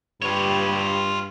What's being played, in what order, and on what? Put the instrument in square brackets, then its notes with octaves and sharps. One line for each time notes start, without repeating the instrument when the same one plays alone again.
[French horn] G2 [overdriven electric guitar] F4 C#5 [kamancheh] G4 B4